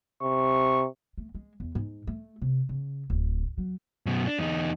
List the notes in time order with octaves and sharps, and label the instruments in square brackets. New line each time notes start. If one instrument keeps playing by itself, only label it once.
[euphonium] C3 [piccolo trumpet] C#6
[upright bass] A3
G#3
E2
G#2
A3
C3
C#3
D1
F#3
[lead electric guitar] F#2 B2
D4
E2 D#4